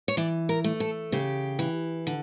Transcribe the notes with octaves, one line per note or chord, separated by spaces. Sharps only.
C#5
E3 D5
A#4
A3
A4
C#3 G4
E3
D3